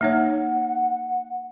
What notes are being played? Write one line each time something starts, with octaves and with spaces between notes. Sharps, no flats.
A#3 D#4 C#5 F#5